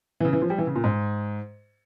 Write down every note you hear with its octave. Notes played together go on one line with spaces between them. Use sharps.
E3
C#3
E3
F3
G3
E3
C#3
A#2
G#2